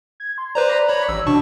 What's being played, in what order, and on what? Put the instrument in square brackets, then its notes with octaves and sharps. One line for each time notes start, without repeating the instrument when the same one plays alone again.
[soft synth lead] G#6
C6
[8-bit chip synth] B4 C5 A#5 [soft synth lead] D5
[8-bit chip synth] C#5 B5
A1 E6
[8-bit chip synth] B2 A5 C#6 [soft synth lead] D4